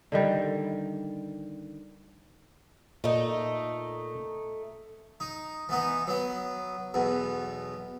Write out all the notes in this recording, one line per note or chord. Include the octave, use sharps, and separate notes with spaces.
D3 D#3 G3
A#2 A3 D#4
D#4
E3 B3 D#4
F#3 B3
B1 E2 B2